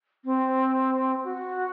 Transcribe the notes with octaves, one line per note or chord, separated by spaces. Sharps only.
C4
F#4